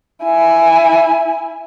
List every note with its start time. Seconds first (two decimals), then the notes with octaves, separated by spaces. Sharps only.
0.24 E4 G#5